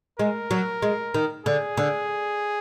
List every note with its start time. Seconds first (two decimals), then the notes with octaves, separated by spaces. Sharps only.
0.19 G#3 A#4
0.51 F#3
0.82 G#3
1.14 D#3
1.46 D3 G#4
1.77 D3